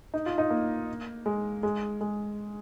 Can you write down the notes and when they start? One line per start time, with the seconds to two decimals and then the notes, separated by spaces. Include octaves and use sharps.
0.14 D#4
0.26 F4
0.38 D#4
0.50 A#3
1.26 G#3
1.63 G#3
2.01 G#3